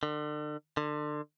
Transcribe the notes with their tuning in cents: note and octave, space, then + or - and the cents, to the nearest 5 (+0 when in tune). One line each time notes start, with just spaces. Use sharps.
D3 +40
D3 +30